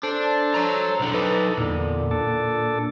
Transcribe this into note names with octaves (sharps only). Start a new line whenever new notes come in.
D4 A4 C5
C#5 A#5
B1 D3
F#3 D#4 A4 B4
E2 A#2 D3
D4 A4